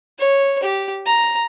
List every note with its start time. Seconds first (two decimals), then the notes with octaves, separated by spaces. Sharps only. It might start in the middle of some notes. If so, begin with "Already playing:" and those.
0.19 C#5
0.63 G4
1.06 A#5